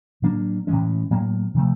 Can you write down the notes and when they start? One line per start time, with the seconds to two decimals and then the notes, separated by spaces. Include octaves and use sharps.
0.22 A2 F#3 A#3 D4
0.67 A2 E3 G#3 C#4
1.10 A2 F#3 A#3
1.54 C3 F3 A3